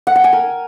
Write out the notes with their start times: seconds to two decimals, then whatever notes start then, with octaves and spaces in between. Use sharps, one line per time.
0.07 F#5
0.15 G5
0.24 G#5
0.33 A#4